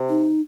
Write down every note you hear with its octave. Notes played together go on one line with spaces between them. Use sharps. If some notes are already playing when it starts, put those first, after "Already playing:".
Already playing: C3
D#4